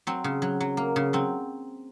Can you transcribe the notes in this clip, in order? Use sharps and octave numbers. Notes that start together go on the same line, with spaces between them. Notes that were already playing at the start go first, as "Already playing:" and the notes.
F#3 C4
C#3
F#3
F#3
A#3
C#3
F#3 C4